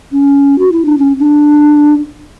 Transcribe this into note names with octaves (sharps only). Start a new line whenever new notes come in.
C#4
F#4
E4
D4
C#4
D4